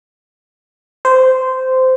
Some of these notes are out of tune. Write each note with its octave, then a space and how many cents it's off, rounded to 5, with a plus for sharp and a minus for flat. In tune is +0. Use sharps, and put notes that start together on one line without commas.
C5 -15